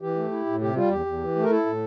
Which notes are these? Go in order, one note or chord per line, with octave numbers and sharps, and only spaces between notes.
E3 G4
A3
E4
A2
C3 G4
G3 F4
E2 G4
E2
E3
A3
A#4
E4 A4
A2